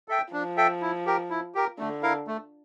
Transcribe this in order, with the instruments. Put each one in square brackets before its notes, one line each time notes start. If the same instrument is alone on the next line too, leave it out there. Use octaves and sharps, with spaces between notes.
[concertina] A4 E5 G5
[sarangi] F3 [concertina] D4
[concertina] A4 E5 G5
E4
G4 A#4
E4
G4 A#4
[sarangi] D3 [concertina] A3
[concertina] E4 A#4 F5
A3